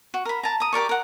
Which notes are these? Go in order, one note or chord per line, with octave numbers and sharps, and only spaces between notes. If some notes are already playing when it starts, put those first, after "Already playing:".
F#4
A#4 B5
A5 A#5
A#5 D#6
G4 A#4 D5 C#6
A#4 F#5